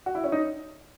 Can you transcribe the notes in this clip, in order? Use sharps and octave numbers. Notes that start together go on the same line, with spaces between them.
F#4
E4
C#4
D#4